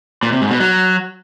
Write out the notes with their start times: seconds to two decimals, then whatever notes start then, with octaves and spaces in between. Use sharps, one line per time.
0.23 A#2
0.32 C3
0.41 G#2
0.51 B2
0.60 F#3